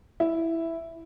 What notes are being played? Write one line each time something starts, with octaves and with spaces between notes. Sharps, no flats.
E4